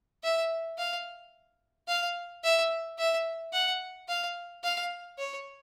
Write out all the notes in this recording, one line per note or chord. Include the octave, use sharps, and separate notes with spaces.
E5
F5
F5
E5
E5
F#5
F5
F5
C#5